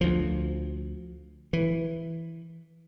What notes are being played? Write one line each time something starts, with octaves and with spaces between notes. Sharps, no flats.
D2 F3
E3